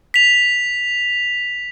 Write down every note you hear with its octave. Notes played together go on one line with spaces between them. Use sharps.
B6 F7